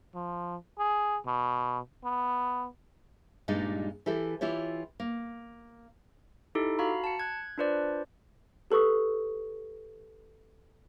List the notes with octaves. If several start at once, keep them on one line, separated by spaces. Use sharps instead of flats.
F3
G#4
B2
B3
G2 A#2 G3 G#3 D#4
E3 E4 G4 A4
E3 E4 F4 G4 C#5
A#3
D#4 E4 G4 A4
F#4 F5 A#5 B5
A5 C#7
F#6 G#6
D4 F4 B4 C5 D5
G4 A4 B4 C#6 D#6